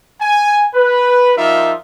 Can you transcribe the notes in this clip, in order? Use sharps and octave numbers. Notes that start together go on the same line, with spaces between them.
G#5
B4
F3 G3 D#4 F4 A#4 E5